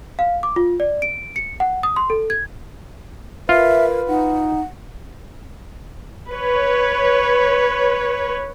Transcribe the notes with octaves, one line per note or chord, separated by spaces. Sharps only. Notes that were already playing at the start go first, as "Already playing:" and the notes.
F5
D6
F4
D5
D7
C#7
F#5
D#6
C6
A4
G#6
F4 A#4 B4 E5
D#4 F#5
B4 C#5